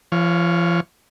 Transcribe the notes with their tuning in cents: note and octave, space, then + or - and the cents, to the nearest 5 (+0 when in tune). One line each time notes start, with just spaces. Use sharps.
F3 -40 C#5 +0 F5 +15